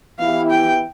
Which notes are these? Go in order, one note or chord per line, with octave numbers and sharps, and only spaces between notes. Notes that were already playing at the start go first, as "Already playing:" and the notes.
E3 B3 E4 G4 F5
G5